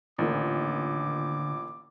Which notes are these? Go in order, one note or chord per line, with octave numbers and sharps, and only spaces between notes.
A1 A#2 D3 D#3 D6